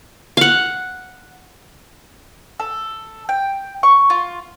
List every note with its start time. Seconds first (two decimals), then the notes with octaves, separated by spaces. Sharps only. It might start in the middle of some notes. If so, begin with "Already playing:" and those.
0.37 F5 F#5
2.60 A4
3.29 G5
3.83 C#6
4.10 F4